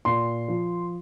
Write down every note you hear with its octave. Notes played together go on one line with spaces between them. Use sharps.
A#2 C6
F3